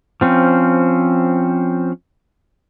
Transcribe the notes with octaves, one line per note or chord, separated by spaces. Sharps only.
F3 C4 C#4